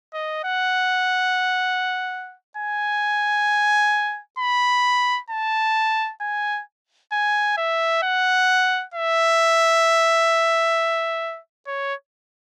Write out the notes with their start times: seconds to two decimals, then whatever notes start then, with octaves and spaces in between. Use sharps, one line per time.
0.13 D#5
0.44 F#5
2.57 G#5
4.38 B5
5.30 A5
6.21 G#5
7.12 G#5
7.57 E5
8.02 F#5
8.94 E5
11.67 C#5